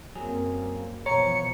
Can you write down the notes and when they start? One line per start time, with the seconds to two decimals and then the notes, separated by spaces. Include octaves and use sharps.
0.15 F#2 F#3 A#3 C4 G#4
1.06 B2 E3 F3 C#5 A#5 C#7